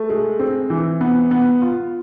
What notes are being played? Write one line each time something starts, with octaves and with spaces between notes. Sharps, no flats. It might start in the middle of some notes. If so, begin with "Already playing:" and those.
Already playing: A3
G#3
C4
E3
B3
B3
F4